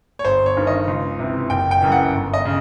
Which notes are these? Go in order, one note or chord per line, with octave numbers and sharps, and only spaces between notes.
C#5
G1 C5
C#5
G2 D#3
D#5
C#2
C3 E3
F#1 G5
G5
F#2 C#3 E3
F#5
G1
D#5
C#3